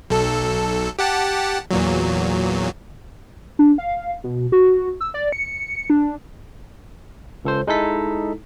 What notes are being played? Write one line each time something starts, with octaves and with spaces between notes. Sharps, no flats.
B1 A4
G4 F#5 A5
E2 A#2 F#3
D4
F5
B2
F#4
E6
D5
C#7
D4
C#2 A4 C5
G#3 D#4 E4 A4 B6